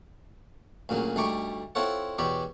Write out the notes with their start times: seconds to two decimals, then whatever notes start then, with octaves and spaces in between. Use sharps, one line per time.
0.89 D2 A#2 C#3 F#3
1.16 D2 G3 A3 D#4 C#6 D6
1.75 C4 E4 F4 A4 C#5 F#5
2.18 E2 B2 G4 C#5 D5 B5